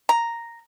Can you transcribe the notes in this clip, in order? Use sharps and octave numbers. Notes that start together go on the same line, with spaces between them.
A#5